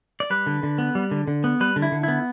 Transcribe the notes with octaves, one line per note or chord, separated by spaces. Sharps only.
D5
G3 B4
D3
D3
B3
G3
D3
D3
B3
G3 B4
D3
E4
D3
B3 E4